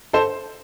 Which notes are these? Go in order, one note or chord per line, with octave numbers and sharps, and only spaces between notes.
A4 C5